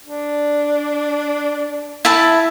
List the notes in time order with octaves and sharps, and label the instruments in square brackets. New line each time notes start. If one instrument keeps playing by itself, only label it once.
[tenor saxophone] D4
[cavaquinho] E4 E5 A5